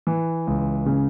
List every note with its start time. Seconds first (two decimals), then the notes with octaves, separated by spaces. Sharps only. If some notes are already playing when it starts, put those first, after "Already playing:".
0.07 E3
0.47 C#2
0.86 C#3